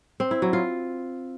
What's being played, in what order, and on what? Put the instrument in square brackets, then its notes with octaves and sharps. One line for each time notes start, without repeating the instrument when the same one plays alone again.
[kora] C4
E4
F#3
F4